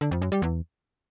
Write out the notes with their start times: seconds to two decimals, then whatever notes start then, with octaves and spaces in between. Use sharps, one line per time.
0.01 D3
0.11 F2
0.22 F#2
0.32 G3
0.42 E2